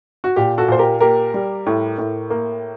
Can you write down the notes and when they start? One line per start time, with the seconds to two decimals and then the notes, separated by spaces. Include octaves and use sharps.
0.24 F#4
0.36 A#2 G4
0.58 F#4 A4
0.68 A#2 C5
0.79 G4 A#4
1.01 A#3 G4 A#4
1.34 G3
1.66 A2
1.98 A2
2.30 A#3